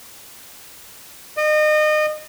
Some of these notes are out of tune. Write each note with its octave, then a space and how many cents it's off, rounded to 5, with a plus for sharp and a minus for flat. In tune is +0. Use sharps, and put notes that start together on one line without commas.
D#5 -30